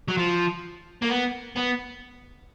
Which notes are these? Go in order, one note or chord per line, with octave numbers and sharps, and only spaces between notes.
F#3
F3
A#3
B3
B3